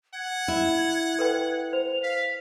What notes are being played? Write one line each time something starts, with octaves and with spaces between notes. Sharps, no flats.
F#5 G#6
E4
A4 B4 G5
C5 F7
F5 B6